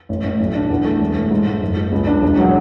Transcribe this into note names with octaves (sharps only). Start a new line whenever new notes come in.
A1
A1
B1
D4
E2
A3
E1
A3
G#2
G#2
F#1
G#3
C#2
D4
E1
F#3